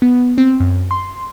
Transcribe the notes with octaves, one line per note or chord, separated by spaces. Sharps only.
B3
C4
F#2
C6